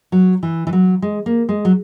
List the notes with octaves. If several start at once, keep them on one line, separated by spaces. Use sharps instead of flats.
F#3
E3
E3
F#3
G#3
A#3
G#3
F#3